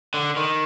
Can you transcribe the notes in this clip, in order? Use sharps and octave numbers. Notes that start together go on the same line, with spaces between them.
D3
D#3